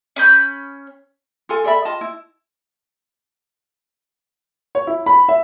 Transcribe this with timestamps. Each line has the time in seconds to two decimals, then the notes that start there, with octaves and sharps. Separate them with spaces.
0.16 C#4 B5 G6
1.49 F4 A4 G#5
1.64 A4 D5 E5 B5
1.85 F4 D#5 A5
2.01 E4
4.75 C#5
4.87 E4
5.06 B5
5.29 E5